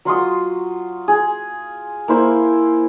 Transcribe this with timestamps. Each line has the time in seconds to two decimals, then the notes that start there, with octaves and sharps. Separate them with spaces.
0.05 F#3 F4 C6 D#6
1.08 G#4
2.08 A#3 E4 C5 F5